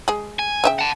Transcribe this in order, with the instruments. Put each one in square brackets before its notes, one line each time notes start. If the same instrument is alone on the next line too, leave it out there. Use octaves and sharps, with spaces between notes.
[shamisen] G#3 G#4
[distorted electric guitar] G#5
[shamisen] C#3 E5 G5
[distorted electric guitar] F#5 A5